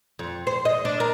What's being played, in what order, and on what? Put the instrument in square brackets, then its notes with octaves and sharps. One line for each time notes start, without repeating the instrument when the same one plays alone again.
[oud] F2
C5
D#5
D4
A#4